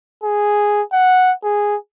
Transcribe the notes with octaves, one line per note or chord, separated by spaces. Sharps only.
G#4
F#5
G#4